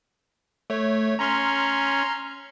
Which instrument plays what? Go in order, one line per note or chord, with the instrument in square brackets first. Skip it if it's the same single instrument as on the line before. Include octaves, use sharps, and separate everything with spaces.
[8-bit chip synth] A3 C#5
[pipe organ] C#4 [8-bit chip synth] A#5 C6 F6